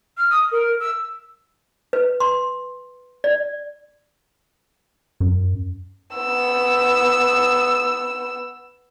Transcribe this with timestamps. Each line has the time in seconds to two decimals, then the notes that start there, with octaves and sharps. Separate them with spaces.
0.17 F6
0.31 D#6
0.52 A#4
0.80 E6
1.93 B4
2.20 C6
3.24 D5
5.20 F#2
6.16 B3 E6